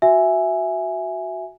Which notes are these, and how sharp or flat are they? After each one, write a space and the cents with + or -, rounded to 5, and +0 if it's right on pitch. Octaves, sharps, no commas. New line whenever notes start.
F#4 +0 E5 +0 G#5 +0